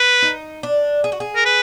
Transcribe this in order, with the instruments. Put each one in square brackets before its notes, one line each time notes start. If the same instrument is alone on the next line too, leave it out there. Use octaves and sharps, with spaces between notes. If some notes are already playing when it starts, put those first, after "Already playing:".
Already playing: [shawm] B4
[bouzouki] D#4
D4
G#4
F#4
G#4
[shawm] A#4
B4